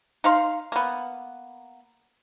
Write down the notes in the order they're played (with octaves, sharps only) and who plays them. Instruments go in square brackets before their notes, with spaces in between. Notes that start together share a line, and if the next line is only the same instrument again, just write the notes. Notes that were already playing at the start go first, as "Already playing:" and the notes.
[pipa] D#4 F5 C6
A#3 B3